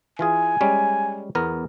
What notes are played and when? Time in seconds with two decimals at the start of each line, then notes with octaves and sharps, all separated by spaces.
0.19 E3 F4 G#4 G#5
0.61 G3 G#3 C#4
1.35 E2 B3 A#4